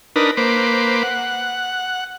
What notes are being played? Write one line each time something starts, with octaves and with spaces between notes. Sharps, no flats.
D4 D#4 A#4 B4
A#3 B4 C5 D6
F#5